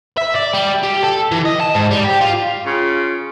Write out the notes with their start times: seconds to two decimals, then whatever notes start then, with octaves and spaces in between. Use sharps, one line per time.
0.18 E5
0.36 D5
0.54 G3
0.83 G4
1.03 A4
1.32 E3
1.45 D#5
1.61 A5
1.74 G#2
1.91 G3
2.04 G4
2.21 F4
2.66 C#3 F4